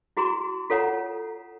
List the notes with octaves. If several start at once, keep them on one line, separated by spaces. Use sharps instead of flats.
E4 F#4 G#4 A#5 C6
F4 A4 C#5 F#5 A#5